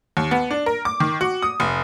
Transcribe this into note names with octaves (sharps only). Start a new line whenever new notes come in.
D#2
B3
D4
A#4
D6
D#3
F#4
D#6
F1